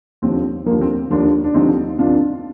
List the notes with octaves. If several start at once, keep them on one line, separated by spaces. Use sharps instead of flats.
D#2 D3 F3 C4
D#2 D3 F3 A#3
C4
D#2 D3 F3 A#3 D4
D4
D#2 D3 F3 C4 D#4
C2 C3 D#3 D4 F4